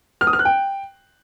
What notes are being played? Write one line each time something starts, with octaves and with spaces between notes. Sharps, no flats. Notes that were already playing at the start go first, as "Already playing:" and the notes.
F6
D#6
F6
F#6
G5